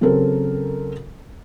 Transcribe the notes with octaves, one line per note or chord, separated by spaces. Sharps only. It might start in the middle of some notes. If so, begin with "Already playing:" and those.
C#3 F#3 C4 A4 A#4